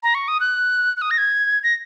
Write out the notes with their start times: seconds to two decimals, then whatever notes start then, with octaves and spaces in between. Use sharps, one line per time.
0.03 A#5
0.15 C#6
0.28 D#6
0.40 F#6
0.97 F#6
1.02 D#6
1.11 A#6
1.18 G#6
1.63 A#6